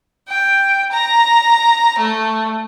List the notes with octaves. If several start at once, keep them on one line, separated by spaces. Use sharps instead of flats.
G5
A#5
A3